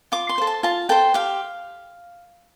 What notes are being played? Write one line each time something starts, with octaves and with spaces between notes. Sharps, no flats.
F4 D6
C6
A4 C5
A5
F4 A5
A4 C5 G5
G4 F5